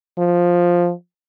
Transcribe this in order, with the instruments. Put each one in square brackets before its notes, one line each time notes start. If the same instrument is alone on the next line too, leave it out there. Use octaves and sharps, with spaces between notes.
[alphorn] F3